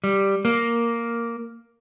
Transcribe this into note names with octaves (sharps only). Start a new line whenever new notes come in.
G3
A#3